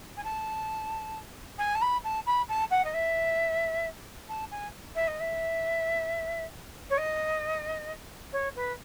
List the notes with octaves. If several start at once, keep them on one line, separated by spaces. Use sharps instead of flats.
G#5
A5
G#5
A5
B5
A5
B5
A5
F#5
D#5
E5
A5
G#5
E5
D#5
E5
C#5
D#5
C#5
B4